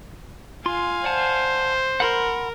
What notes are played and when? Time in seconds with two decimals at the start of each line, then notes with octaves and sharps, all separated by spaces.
0.66 F4 F5 G#5 C6
1.04 C5 D5 F#5 A5
2.00 A#4 F#5 B5 C6